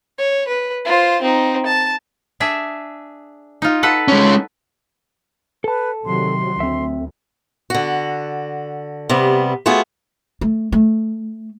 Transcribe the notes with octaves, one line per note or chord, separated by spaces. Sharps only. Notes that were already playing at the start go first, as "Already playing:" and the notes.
C#5
B4
F4 C5
C4 D#4
A5
D4 G#4 E5
D#4 F4
A4 B4 F#5
G#3 C#4
A4 B4 A5
C3 D#3 F#3 C6
D2 C4 E5
D3 F#4
C3 G3 B3
A3 B3 F4 F#4 G#4
A3
A3